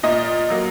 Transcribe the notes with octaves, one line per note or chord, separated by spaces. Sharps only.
A#2 D#5
F#3 A#3